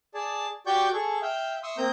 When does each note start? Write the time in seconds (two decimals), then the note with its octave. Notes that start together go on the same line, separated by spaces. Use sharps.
0.14 G#4 D5 A5
0.67 F#4 G4 D5 G5 C#6 G6
0.93 G#4 A4 C#6
1.22 E5 F5 G5
1.63 E5 C6 C#6 D#6 E6
1.78 A#3 C4 A#5 D#6 G6